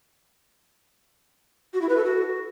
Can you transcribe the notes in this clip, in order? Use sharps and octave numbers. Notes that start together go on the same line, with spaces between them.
F#4
E4
B4
A4
F#4